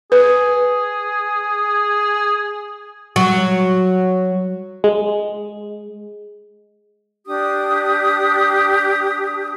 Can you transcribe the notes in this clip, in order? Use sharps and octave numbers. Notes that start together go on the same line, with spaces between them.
G#4 B4
F#3
G#3
D4 G4 D#6